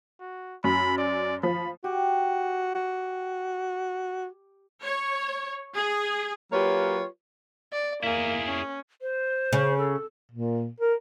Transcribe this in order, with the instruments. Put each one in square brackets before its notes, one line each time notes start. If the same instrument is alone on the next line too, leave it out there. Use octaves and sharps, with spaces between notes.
[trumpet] F#4
[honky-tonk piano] F#2 [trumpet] B5
[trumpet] D5
[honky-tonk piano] F3 [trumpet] B5
[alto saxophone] F#4 [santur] G4
[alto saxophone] F#4
[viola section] C#5
G#4
[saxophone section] F#3 A#3 F4 G4 B4 C#5
[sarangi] D5
[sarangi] A#3 [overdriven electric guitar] E4 G#4
[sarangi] C#4
[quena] C5
[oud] C#3
[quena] A4
[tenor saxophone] A#2
A#4